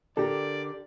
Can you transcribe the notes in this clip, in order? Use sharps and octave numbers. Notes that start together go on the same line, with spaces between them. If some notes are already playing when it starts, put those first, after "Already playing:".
D3 G4 A4 A#4 D5